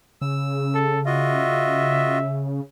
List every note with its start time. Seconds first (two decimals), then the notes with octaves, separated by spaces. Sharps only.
0.22 C#3 E6
0.74 A4
1.06 F4 F#4 D#5 E5